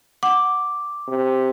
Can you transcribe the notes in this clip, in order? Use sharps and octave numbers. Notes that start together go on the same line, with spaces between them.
F#5 D6
C3